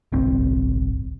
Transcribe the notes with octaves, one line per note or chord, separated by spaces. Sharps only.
D1 G1 C2 C4